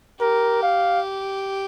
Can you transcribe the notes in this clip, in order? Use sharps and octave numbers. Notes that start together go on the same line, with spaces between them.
G4 A#4
F5